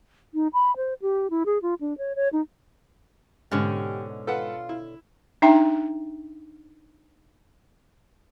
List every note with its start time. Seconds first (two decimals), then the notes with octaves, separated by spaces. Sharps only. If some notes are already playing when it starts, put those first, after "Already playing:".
0.34 D#4
0.54 B5
0.76 C5
1.02 G4
1.30 E4
1.46 G#4
1.62 F4
1.81 D4
1.98 C#5
2.16 C#5
2.33 D#4
3.51 G#2 B2 D3 C#4 G4
4.27 F4 A4 B4 F#5
4.69 E4
5.42 D4 D#4 E5 G5 A#5